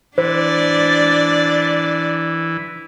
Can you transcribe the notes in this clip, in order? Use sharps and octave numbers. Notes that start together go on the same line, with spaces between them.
E3 D4 C5 D5